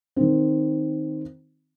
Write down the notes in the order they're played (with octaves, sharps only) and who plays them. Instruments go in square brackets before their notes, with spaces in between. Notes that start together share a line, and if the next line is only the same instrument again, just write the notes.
[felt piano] D#3 C4